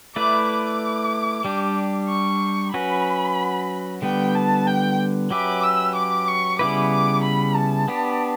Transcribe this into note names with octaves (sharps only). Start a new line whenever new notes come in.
A3 E4 B4 D5 D6
D6
G3 D4 G4
C#6
F#3 C#4 F#4 B4 B5
D3 G3 B3 G5
A5
G5
F#3 C#4 G4 B4 E5 D6
E6
D6
C#6
C#3 G3 B3 E4 B4 D6
D6
B5
A5
B3 D4 G4